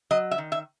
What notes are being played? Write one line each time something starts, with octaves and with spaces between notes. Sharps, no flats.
F#3 D#5
E5
D#3
E5